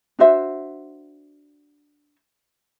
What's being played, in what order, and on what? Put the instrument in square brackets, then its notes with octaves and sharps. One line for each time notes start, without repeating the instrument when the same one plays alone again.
[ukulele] D4 F#4 C5 E5